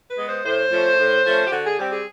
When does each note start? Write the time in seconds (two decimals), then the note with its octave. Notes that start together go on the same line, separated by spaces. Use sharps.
0.08 B4
0.18 G#3 B3
0.27 C5
0.44 A2 C5
0.71 F3 A3 C#4
0.98 A2
1.25 F3 A3 C#4
1.46 G4
1.51 D3 F#4
1.64 G#4
1.79 G3 C4 G4
1.91 G#4